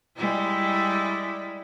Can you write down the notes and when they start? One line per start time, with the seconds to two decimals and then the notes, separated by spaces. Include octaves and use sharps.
0.16 G3 G#3 E4